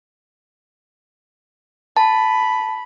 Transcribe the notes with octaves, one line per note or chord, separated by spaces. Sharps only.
A5 B5